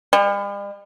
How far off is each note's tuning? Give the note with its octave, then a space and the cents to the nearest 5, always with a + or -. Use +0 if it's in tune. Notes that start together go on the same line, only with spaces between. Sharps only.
G3 +45